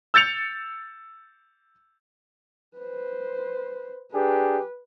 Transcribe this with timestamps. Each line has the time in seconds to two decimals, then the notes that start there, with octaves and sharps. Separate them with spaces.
0.14 E6 G6 A6 C#7 F7
2.77 B4 C5
4.13 D4 G4 G#4 B4